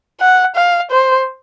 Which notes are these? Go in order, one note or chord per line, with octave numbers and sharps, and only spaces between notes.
F#5
F5
C5